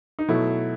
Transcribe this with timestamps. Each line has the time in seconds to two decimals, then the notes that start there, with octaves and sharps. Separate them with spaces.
0.19 D#4
0.28 B2 F#3 A3 E4